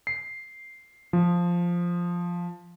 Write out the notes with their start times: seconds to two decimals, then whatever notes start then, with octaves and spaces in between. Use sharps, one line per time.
0.07 C7
1.13 F3